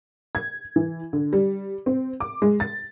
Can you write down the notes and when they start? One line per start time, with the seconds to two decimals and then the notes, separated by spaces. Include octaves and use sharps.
0.35 G#6
0.76 E3
1.13 D3
1.33 G3
1.86 C4
2.20 D6
2.42 G#3
2.60 A6